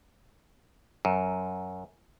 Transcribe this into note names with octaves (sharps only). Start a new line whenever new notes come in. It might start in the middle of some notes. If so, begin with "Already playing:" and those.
F#2